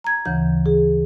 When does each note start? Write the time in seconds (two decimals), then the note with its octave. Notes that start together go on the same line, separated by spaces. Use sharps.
0.04 A#5 G#6
0.25 D2 C#3 E3 G6
0.66 G#4